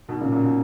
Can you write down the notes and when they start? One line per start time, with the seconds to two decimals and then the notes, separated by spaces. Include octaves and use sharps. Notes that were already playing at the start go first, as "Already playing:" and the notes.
0.09 B2 D#3
0.21 A#2 C#3
0.32 A#2 C#3
0.44 B2